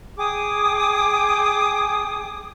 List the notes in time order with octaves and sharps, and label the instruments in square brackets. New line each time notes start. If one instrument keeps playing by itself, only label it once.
[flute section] G#4 G5 D6 D#6